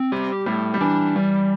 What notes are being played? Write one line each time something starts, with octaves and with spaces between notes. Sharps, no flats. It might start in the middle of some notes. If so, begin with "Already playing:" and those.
Already playing: C4
G3 G4
A2 G3
G3
E3 D4
G3